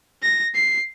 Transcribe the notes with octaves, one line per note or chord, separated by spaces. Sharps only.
A#6
C7